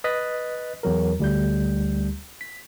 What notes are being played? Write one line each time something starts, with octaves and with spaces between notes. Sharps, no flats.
B4 D#5 D#6 F#6 A6 B6
E2 F#3 A#4
D2 G3 G6
B6